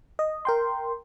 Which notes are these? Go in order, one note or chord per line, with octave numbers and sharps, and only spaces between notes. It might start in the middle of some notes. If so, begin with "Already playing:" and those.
D#5
A#4 G5 C6